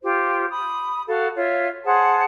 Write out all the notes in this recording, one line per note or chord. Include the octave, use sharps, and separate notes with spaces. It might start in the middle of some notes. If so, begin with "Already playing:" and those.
F4 G4 C5
B5 D#6
F#4 A4 F5
F4 C#5 E5
G#4 C5 F#5 A5